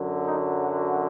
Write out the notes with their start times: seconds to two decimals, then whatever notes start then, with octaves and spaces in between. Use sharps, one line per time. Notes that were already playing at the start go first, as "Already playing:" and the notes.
Already playing: F#2 D3 F#3
0.23 D#4
0.59 F#4